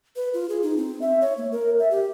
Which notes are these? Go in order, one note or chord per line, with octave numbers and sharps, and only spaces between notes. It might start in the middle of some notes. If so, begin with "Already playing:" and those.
B4
F4
G#4
D#4
C4
E5
C#5
A#3
A#4
E5
G4